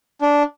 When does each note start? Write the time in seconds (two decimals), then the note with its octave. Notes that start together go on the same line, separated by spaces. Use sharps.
0.22 D4